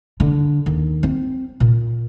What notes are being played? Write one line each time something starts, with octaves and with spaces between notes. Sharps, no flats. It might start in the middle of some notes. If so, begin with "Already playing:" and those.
D3
D#2
C4
A#2